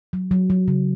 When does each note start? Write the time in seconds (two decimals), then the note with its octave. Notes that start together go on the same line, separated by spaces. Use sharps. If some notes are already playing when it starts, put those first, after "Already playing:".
0.13 F#3
0.31 F#3
0.50 F#3
0.68 C#3